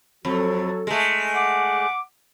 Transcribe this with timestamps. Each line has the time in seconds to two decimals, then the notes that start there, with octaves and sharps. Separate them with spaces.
0.25 F2 F#3 F#4 A4
0.87 G#3 A3
1.34 F#5 D6